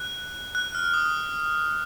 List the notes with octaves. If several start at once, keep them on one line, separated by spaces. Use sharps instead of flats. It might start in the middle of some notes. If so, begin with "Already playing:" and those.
Already playing: F#6
F#6
F6
D#6